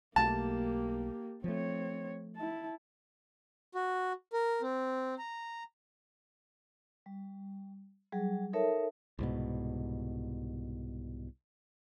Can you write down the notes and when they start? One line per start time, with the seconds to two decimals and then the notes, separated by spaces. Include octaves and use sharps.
0.16 B1 A3 A#3 G4 A5
1.44 F3 A3 C4 C#5
2.36 E4 A5
3.75 F#4
4.33 A#4
4.62 C4
5.18 A#5
7.06 G3
8.13 F#3 G3 G#4
8.53 D#4 A4 A#4 C#5 E5 A5
9.19 C2 G#2 B2